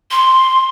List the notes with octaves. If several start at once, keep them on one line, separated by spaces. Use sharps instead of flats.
C6